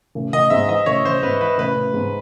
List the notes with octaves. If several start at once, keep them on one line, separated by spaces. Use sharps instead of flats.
A1
A1 D#5
G#2 E5
E3 D#5
A1 C#5
A1 C5
G#2 B4
E3 B4
A1 B4
A1
G#2